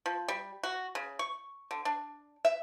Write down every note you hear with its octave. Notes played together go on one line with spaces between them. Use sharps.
F3
G3
F#4
C#3
C#6
D3
D4
E5